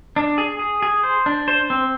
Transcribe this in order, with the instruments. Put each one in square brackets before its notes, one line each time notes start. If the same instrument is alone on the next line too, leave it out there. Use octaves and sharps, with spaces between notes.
[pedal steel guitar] D4
G#4
G#4
G#4
C5
D4
C5
C4